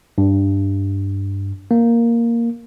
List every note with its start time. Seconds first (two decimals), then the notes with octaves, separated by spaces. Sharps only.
0.18 G2
1.71 A#3